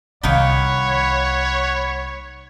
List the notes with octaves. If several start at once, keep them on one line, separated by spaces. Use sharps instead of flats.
C2 D#3 A#3 D#4 C#5 F#5 B5